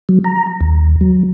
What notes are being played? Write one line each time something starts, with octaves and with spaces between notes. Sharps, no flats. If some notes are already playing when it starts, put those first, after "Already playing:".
F#3
A#5
D#2
F#3